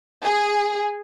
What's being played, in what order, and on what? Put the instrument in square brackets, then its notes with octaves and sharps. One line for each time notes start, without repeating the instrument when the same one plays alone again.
[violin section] G#4